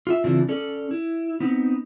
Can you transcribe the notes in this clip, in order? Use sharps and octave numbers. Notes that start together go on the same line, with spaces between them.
F4 E5
C#3 E3 C4 D4 E4 F4
C#4 A4 D5
E4
B3 C4 D#4